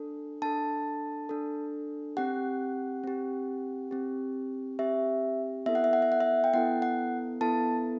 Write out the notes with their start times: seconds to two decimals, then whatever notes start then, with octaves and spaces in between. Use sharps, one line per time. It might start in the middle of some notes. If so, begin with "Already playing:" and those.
Already playing: D4 A4
0.42 D4 A4 A5
1.29 D4 A4
2.17 C4 G4 F#5
3.04 C4 G4
3.91 C4 G4
4.79 C4 G4 E5
5.66 B3 E4 A4 E5
5.75 F#5
5.84 E5
5.93 F#5
6.02 E5
6.12 F#5
6.20 E5
6.44 G5
6.54 B3 E4 A4 F#5
6.82 F#5
7.41 B3 E4 A4 A5